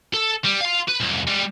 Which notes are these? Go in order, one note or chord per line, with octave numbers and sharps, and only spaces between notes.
A4
G3
F5 C6
B4
C2 F2
G3 G#3